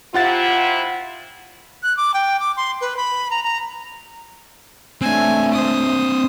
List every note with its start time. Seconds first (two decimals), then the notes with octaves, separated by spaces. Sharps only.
0.14 C3 E4 F4 F#5 A6
1.83 F#6
1.97 D6
2.14 G5
2.40 D6
2.57 C6
2.81 B4
2.97 B5
3.31 A#5
3.43 A#5
5.01 A3 C4 D4 G#5
5.54 C5 D#6